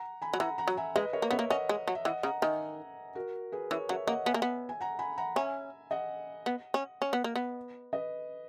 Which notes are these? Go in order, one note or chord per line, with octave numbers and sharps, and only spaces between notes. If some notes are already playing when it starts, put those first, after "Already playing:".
Already playing: F#5 A#5
G#5 B5
F#3
E3 F#5 A#5
F#5 A#5
F#3
E5 G#5
G#3 B4 D#5
A#4 C#5
A#3
B3 C#5 E5
A#3
C#4 D#5 F#5
G#3
F#3
E5
E3 D#5 F#5
C#3 F#5 A#5
D#3 E5 G#5
F#4 A#4
G#4 B4
E3 A#4 C#5
F#3 C#5 E5
A#3 D#5 F#5
B3 E5 G#5
A#3
B3
G#5
F#5 A#5
G#5 B5
F#5 A#5
C#4 E5 G#5
D#5 F#5
B3
C#4
C#4
B3
A#3
B3
B4 D#5